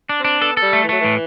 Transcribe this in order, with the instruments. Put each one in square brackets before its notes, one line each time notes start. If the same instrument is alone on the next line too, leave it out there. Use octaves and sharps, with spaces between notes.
[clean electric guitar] D4
[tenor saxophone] C4 [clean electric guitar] D4
[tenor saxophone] B3 [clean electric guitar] A4
[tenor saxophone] G3 [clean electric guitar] A4
[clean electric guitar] A3
[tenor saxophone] E3
[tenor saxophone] F#3 [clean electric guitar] A3
[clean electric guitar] A2 [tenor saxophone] E3